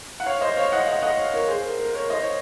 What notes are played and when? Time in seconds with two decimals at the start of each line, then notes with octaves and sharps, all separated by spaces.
0.20 F#5
0.26 C#5 F5
0.41 C5 D#5
0.56 C#5 F5
0.72 D#5 F#5
0.88 D#5 F#5
1.02 D#5 F#5
1.18 C#5 F5
1.33 A#4 C#5
1.48 G#4 C5
1.64 A#4
1.79 A#4
1.94 A#4 C#5
2.10 C5 D#5
2.20 C#5